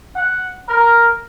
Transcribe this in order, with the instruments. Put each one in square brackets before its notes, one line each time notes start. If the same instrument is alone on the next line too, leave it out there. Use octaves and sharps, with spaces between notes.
[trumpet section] F#5
A#4